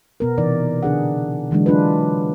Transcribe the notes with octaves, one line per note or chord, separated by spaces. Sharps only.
B2 B3 A#4
C3 E3 D#4 D5
D3 D4 G#4 F#5
D3 E3 F#3 G#3 D4
F#3 D4 F4 B4